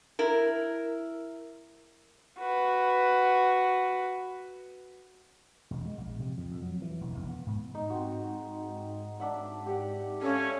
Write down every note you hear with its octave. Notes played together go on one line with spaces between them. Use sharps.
E4 A#4
F#4 B4
E1
G#3
A#1
C3
F2
F2
F#3
E3
E1
E1
B3
G#2
G#2 D#4
C4 F#4
D4 E5 F#5
G4 F#5
C#4 A4 E5 F5